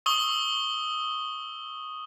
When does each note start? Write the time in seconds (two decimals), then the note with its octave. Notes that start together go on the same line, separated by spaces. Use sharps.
0.06 C#6 D#6 E6 G7